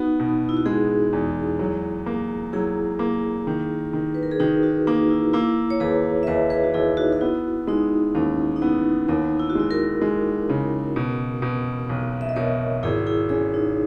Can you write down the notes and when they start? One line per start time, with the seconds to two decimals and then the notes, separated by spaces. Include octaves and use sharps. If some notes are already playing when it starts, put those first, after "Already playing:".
Already playing: B3 D#4 F#4
0.20 B2
0.49 E4
0.57 F#4
0.65 G#3 E4 G#4
1.13 E2
1.59 F#3
2.06 A#3
2.53 F#3 E4 G#4
2.99 A#3
3.47 D#3
3.93 D#3
4.15 B4
4.23 A#4
4.31 G#4
4.40 D#3 D#4 F#4
4.63 D#4 F#4
4.87 A#3 D#4 F#4
5.10 E4
5.33 A#3 E4
5.70 C#5
5.80 D#2 G#4 B4
6.23 E5
6.27 D#2 B4 D#5
6.50 G#4 B4
6.64 F#4
6.74 D#2 E4 G#4
6.97 D#4 F#4
7.12 F#4
7.21 B3 E4
7.67 G#3 D#4
8.15 D#2 C#4
8.56 D#4
8.62 B3 E4
9.08 D#2 D#4
9.40 E4
9.50 F#4
9.55 G#3 E4
9.71 F#4 A#4
10.02 G#3
10.49 C#3
10.96 B2
11.42 B2
11.89 B1
12.21 E5
12.29 D#5
12.36 B2 A#4 C#5
12.83 G#1 E4 G#4
13.06 E4 G#4
13.29 C#4 E4 G#4
13.54 D#4